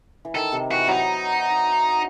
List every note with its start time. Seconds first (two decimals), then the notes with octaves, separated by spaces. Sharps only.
0.25 E3
0.35 D#3 A4
0.52 C3
0.70 E3 F#4
0.88 F#3 D#4